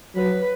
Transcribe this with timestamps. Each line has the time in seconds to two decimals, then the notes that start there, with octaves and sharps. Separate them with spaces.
0.15 F#3 B4